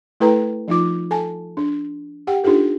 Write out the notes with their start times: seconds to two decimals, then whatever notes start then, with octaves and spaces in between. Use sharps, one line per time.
0.20 A3 E4 A4 B4 G5 A#5
0.68 F3 D#4 F4 D6
1.11 A4 G#5 A5
1.57 D4
2.27 G4 F#5 G5
2.44 D4 D#4 F4 G4 A4